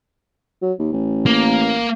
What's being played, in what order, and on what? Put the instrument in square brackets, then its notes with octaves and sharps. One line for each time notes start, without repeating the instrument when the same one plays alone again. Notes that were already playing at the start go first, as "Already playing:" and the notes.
[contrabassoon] F#3
D#2
A1
[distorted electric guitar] A#3